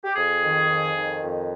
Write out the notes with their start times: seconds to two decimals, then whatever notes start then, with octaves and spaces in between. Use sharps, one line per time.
0.04 G4
0.15 F2 G#4
0.43 D#3
0.69 F2
0.96 D#3
1.23 F2